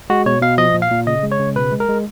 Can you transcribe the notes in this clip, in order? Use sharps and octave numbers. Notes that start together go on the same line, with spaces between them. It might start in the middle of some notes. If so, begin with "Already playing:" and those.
G#3 F#4
B2 C#5
B2 F5
F3 D#5
A#2
F5
A#2
C#3 D#5
G#3
C#5
C#3
B2 B4
G#3
A#4
G#3